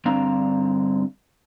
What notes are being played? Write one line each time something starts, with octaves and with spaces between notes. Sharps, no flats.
G2 D3 C4 D4 F5 A#5